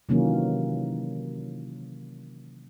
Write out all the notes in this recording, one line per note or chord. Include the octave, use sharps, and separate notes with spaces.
C3 D#3 E3 F#3 A#3 C#4